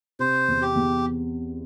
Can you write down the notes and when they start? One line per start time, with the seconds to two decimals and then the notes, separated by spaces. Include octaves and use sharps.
0.19 C3 C5
0.48 E2
0.62 G4
0.76 E2